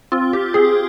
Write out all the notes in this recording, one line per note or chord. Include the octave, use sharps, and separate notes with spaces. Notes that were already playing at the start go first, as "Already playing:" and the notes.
C4 F4
G4
C4 G#4